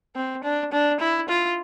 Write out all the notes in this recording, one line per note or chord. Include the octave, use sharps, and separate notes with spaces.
C4
D4
D4
E4
F4